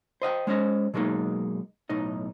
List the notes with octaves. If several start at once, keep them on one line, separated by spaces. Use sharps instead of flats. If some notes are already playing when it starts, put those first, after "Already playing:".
C5 D#5 F#5 G5
G#3 C#4 C5 D#5
B2 F#3 G#3 A#3 D#4
B1 A2 D#4 D#5